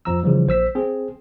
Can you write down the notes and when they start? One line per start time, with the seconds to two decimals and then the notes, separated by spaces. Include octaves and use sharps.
0.05 F2 F3 A#5 E6
0.23 C#3 E3 F3 G3
0.47 A#1 C5 E6 B6
0.75 C4 G#4